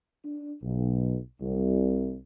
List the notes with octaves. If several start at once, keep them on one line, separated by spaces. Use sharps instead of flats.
D4
B1
C2